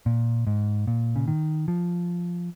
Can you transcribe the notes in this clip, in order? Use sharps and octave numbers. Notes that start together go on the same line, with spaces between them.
A#2
G#2
A#2
C#3
D#3
F3